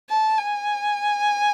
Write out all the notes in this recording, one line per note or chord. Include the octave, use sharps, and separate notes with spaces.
A5
G#5